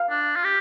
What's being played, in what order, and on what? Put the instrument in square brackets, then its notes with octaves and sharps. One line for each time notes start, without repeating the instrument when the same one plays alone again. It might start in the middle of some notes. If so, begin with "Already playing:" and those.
Already playing: [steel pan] F5
[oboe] D4
F4
G4